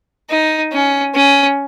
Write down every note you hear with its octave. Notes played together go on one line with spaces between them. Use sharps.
D#4
C#4
C#4